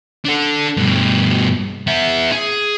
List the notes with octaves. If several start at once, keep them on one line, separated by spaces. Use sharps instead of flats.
D4 A4
G2 B2
B3 E5
G#4